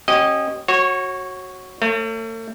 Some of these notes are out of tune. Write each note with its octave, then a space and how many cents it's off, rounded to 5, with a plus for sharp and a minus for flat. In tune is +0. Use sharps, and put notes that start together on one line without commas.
C#4 -30 G4 -35 D#5 -10
F#4 +0 C#5 -25
A3 +40 C#5 -15